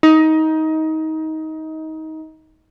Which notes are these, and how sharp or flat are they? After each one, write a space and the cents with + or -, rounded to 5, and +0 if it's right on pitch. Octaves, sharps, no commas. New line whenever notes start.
D#4 +20